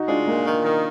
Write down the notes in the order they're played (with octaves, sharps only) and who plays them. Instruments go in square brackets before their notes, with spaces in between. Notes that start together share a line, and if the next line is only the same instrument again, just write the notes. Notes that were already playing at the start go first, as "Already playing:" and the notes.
Already playing: [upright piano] D#4 F#4
[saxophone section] G#3 [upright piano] D4 F4
[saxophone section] A#2 [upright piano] A#3
[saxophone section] D#3
D#3